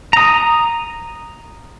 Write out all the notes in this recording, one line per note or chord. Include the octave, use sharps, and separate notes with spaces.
A#5 D#6